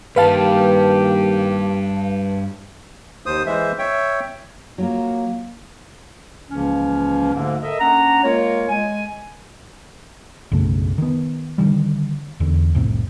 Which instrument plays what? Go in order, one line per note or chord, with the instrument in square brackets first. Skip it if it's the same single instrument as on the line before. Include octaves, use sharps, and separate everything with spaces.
[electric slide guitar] G2 G3 [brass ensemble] D#3 A#3 G4 [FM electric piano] B4 F5 A5
[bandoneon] D#2 C5 D#6
E3 G#3 C5 E5
C#5 E5 G5
[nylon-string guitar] F#3 F4 A#4 [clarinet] A#3
[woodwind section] C#2 C#3 E3 F3 A#3 C#4
D2 G#2 D3 A#3
A4 A#4 D#5 E5
A#3 C#4 D4 F#5 A#5
G#3 A#3 F4 A#4 C#5
G#3 G#5
[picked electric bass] B1 F#2 C#3 A3
D#3 B3
D3 D#3 G3
E2 D3
F1 C2 A2 C3